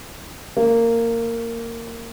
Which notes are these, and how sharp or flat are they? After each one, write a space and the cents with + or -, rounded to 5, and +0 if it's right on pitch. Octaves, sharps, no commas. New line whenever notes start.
A#3 -15